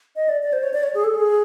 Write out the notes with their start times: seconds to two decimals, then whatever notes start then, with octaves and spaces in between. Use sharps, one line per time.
0.16 D#5
0.29 D5
0.43 D5
0.53 C5
0.63 C#5
0.73 D5
0.83 C#5
0.94 G#4
1.04 A4
1.14 G#4